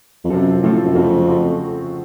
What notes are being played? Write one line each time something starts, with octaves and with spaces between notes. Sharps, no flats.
F2
F#2 C3 F3 C4 F4 A4
A2 C3 F3 C4 F4 A4
F#2
F2 C#3 F3 A3 C4 F#4
C#3 F3 A3 C4 F#4